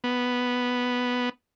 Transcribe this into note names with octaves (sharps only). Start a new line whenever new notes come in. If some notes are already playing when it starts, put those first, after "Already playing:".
B3